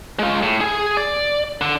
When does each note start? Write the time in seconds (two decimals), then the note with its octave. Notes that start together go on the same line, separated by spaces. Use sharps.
0.19 G#3 F4
0.43 A2
0.61 G#4 G#5
0.97 D5
1.61 D3